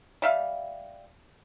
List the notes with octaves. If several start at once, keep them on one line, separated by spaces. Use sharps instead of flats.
G3 E5 F5